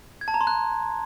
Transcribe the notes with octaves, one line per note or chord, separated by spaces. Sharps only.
G#6
A5
A#5
C6
F#6